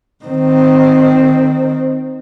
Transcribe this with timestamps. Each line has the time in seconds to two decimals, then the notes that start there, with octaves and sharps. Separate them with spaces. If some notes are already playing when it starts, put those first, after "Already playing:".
0.25 D#3 C4